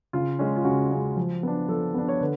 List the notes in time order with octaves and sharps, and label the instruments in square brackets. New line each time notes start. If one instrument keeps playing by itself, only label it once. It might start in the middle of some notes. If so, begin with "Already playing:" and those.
[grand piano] C#3 F4
G#3 C#4
F4
C#3 F#4
G#3 C#4
F3
B3 D4
F3 A4
B3 D4
C#5
D3 B4